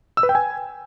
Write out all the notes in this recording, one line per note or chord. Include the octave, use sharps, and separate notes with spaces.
E6
B4
G5
G#5